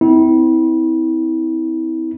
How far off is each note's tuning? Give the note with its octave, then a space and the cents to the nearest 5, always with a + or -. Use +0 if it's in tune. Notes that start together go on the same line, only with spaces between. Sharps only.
C4 -30 E4 -30